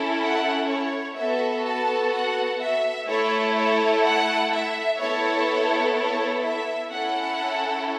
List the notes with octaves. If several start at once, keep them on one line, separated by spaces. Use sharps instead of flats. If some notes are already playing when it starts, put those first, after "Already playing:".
Already playing: C#4 E4 A4
F#5
C#5
B3 F#4 A4 E5
A5
F#5
E5
A3 E4 A4 C#5
C#5
F#5
E5
B3 E4 A4 C#5
C#5
E5
C#4 E4 A4 F#5